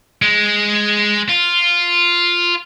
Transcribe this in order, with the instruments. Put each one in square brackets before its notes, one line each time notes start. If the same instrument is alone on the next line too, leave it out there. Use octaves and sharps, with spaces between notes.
[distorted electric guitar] G#3
F4